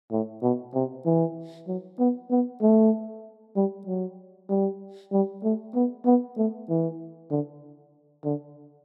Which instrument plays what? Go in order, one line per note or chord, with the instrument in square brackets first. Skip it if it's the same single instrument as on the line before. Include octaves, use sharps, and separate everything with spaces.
[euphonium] A2
B2
C3
E3
F#3
B3
B3
A3
G3
F#3
G3
G3
A3
B3
B3
A3
E3
D3
D3